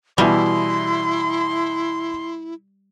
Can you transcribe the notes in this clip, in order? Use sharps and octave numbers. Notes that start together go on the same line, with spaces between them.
B2 E3 G3 E4 C6